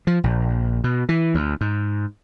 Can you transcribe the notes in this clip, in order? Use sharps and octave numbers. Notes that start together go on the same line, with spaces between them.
F3
A#1
B2
E3
D2
G#2